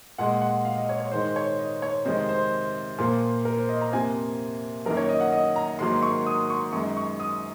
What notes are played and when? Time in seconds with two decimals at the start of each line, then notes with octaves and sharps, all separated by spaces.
0.18 A#2 G#3 F#5
0.42 F#5
0.65 F5
0.78 D#5
0.89 C#5
1.00 C#5
1.11 G#2 D#3 G#3 C5
1.36 C#5
1.59 D#5
1.82 C#5
2.05 F2 C3 D#3 G#3 C5
2.29 C5
2.98 A#2 F3 A#3
3.45 A#4
3.58 C5
3.69 D#5
3.81 A#5
3.92 F2 C3 F3 A#3 G#5
4.86 F#2 D#3 A#3 A#4
4.97 C#5
5.09 D#5
5.20 F#5
5.32 D#5
5.56 A#5
5.79 G#2 D#3 F#3 A#3 C6
6.03 C#6
6.26 D#6
6.50 C#6
6.72 F#2 D#3 G#3 C#6
6.97 C#6
7.20 D#6